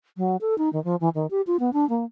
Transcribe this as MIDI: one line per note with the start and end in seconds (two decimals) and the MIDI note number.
0.17 0.37 54
0.41 0.57 69
0.58 0.69 63
0.73 0.82 51
0.84 0.96 53
1.01 1.09 52
1.15 1.27 51
1.31 1.41 67
1.47 1.57 65
1.60 1.70 59
1.73 1.87 62
1.89 2.05 58